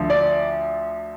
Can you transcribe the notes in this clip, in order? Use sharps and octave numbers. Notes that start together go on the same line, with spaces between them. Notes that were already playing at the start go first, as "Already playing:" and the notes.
Already playing: D2 D3 F3
D5